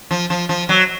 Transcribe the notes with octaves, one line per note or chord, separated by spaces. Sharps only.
F3
F3
F3
F#3